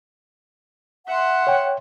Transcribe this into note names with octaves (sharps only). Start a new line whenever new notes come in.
E5 F#5 C6
C#5 G5